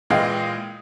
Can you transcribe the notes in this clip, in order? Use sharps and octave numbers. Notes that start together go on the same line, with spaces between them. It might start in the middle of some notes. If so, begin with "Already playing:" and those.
A#2 E3 G#3 D#5 F5 G5